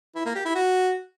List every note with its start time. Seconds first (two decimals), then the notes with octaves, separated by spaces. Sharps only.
0.15 E4
0.25 A#3
0.35 G4
0.45 E4
0.55 F#4